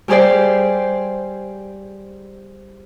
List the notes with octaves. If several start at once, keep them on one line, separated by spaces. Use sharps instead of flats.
G3 G4 G#4 C5 D5 G5